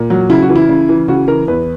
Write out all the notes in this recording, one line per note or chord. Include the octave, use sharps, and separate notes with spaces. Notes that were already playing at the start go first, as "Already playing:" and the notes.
Already playing: A#2
F#3
C#3 E4
F#4
E3
E4
C#3
E3
C#3 F#4
E3 A#4
E2 B4